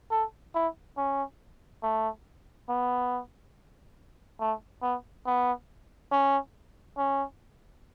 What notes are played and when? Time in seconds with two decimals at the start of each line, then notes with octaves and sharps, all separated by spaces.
0.11 A4
0.55 E4
0.97 C#4
1.83 A3
2.69 B3
4.40 A3
4.82 B3
5.26 B3
6.12 C#4
6.98 C#4